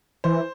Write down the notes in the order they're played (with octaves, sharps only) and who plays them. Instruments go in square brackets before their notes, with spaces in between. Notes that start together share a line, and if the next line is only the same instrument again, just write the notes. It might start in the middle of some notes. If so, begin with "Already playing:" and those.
[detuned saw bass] E3 [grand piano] C5